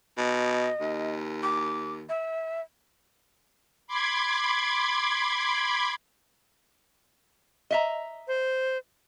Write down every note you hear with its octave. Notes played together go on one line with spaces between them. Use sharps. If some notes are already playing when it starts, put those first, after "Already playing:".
B2 D#5
D#2
D6
E5
B5 C6 D6 G#6
D#5 E5 A#5
C5